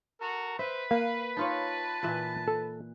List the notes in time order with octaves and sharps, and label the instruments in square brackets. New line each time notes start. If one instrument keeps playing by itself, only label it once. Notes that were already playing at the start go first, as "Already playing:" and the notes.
[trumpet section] F#4 A4 A#5 [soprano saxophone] A#4
[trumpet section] B4 [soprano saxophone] C5 [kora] E5
[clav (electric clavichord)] A#3 [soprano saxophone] F5
[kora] D#4 F4 C#5 [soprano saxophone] A5
[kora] A#2 E3 E5
[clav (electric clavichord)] A4